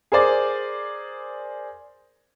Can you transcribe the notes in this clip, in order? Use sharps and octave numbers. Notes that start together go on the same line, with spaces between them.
G#4 A#4 C5 D5